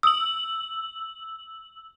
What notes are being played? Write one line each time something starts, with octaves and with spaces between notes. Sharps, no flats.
D#6 E6 F#7